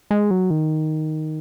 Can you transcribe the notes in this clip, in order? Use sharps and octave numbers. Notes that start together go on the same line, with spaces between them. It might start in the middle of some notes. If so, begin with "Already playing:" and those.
G#3
F#3
D#3